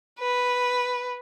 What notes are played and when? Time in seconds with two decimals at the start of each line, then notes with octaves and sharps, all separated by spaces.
0.19 B4